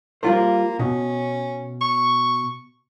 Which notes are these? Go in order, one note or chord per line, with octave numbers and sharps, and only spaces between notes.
G3 A#3 F4 C5
B2 C#4
C#6